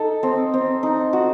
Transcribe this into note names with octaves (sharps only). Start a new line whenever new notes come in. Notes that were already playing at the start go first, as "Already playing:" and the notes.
Already playing: D#4 A4
C4
C4
D#4
F#4